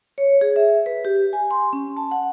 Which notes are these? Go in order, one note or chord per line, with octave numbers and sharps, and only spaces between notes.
C#5
G#4
E5
B4
G4
G#5
C6
C#4
A5
F#5